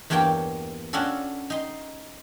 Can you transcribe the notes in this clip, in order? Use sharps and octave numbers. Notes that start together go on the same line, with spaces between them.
E2 G2 A#3 C#5 G5 A5
C#4 D4 F4 F#4 A4
D#4 C6